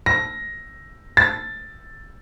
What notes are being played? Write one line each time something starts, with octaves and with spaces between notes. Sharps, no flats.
A#6
A6